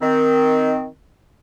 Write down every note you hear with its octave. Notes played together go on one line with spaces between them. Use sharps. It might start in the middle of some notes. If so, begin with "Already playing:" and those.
D#3 C4